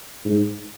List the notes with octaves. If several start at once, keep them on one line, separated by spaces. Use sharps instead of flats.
G#2